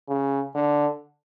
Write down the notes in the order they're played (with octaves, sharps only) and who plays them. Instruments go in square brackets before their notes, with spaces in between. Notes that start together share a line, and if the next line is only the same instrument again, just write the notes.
[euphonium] C#3
D3